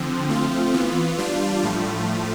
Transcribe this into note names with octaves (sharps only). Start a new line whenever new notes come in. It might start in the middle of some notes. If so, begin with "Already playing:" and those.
Already playing: D3 F3 C4
F3 A3 C4 F4
E3 B3 F4
G3 D4 F4
A2 F3 A3